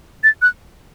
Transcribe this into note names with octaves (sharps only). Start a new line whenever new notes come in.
A6
F#6